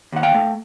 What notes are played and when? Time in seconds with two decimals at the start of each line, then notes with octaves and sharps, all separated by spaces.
0.12 D#2 F#5
0.23 F5 G5
0.34 A3